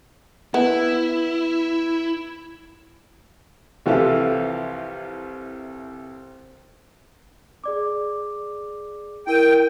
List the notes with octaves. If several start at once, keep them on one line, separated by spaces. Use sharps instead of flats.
B3 E4
C2 E3 F3 G4 A4 F5
G#4 D5 D6
E4 A#4 G5 D#7